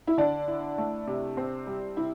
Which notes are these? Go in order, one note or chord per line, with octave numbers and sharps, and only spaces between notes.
E4
D3 D4
E4
A3
C3
C4
G3
C3 E4